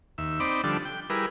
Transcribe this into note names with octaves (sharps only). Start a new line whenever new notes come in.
D#2 E5
C4 D#4 D5 B5 D6
D3 F3 G3 D4 A4
G5
G3 E4 G#4 A#4 B4